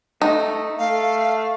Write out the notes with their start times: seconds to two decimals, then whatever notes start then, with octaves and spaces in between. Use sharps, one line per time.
0.21 A3 D#4
0.79 A3 F5